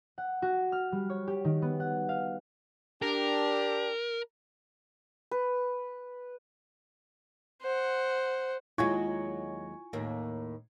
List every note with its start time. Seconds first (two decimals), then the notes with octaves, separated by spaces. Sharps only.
0.18 F#5
0.42 F#4
0.72 F6
0.92 G3
1.10 C#5
1.27 G4
1.45 D#3
1.62 B3
1.80 F#5
2.09 F5
3.02 D4 G4 A#4
5.31 B4
7.62 C5 F#5
8.78 D#2 F#3 G#3 E4 F4 G#5 C#6 G#6
9.93 D#2 A2 A#3